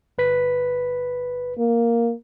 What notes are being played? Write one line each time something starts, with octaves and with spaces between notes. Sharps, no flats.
G1 B4 B6
A#3